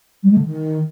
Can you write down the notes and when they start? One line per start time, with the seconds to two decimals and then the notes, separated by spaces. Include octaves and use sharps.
0.23 G3
0.31 G#3
0.38 D3
0.45 D#3